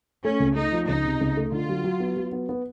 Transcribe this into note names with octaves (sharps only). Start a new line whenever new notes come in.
A3 C#4
C#2
A3 D#4
F3
C#2 D#4
C3
C#2
A3
D3 F4
F#3
F#3
B3
F#3
B3
B3